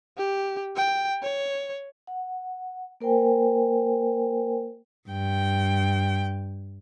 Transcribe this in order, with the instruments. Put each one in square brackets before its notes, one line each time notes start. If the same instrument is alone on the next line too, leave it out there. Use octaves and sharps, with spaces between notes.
[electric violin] G4
G5
C#5
[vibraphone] F#5
A#3 A#4 C5 G5 G#5
[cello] G2 G5